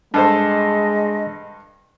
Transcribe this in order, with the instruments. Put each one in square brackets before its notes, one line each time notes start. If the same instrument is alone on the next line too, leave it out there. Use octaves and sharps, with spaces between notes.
[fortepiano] G2 A4 C5 [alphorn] G#3 [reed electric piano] D4 A5 [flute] D#5